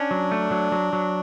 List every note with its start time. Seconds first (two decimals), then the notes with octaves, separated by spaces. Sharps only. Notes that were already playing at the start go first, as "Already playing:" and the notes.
Already playing: C#4 D4
0.11 F#3
0.32 A3
0.51 F#3
0.72 F#3
0.93 F#3